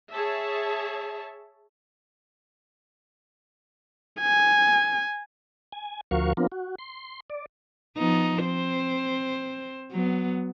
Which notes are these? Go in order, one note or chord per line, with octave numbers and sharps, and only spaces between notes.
G#4 C#5 E5 A5
G#5
G#5
D2 F3 F#4 A#4 F5 C#6
F3 B3 C4 D4 F4 A#4
F#4
C6
D5
F3 B3 D#4
C4 C5
F#3 B3